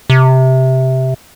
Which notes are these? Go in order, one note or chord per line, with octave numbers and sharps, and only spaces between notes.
C3